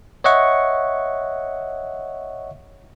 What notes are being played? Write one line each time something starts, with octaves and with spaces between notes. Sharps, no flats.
C#5 D#5 E5 F#5 C#6